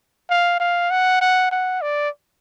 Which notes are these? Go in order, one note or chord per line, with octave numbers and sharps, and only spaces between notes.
F5
F5
F#5
F#5
F#5
D5